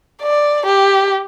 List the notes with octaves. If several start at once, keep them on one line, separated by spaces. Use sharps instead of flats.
D5
G4